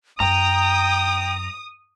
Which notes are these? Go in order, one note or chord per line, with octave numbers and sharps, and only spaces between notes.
F#2 G5 A#5 D#6